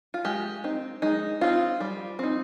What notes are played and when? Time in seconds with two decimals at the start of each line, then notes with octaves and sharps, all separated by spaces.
0.14 F4
0.25 G#3 G4
0.64 C4 D#4
1.02 G#3 D#4
1.41 C4 D#4 F4
1.80 G3
2.19 C4 D#4